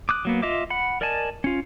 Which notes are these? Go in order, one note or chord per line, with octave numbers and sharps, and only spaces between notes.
D6 D#6 F#6
F#3 A#3 B3
F4 D#5 E5 D6
F#5 B5
A#4 D5 D#5 G#5 A5
C#4 F4